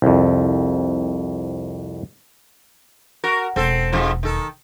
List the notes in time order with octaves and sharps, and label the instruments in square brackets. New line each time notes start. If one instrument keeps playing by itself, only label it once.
[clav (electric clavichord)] C2 F2
[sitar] F#4 A#4
[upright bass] E1 [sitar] C4 A4
[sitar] F2 G#2 F3
D#3 A4